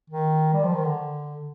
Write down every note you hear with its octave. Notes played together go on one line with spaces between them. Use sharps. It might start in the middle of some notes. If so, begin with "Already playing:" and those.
D#3
G3
F3
D#3
D3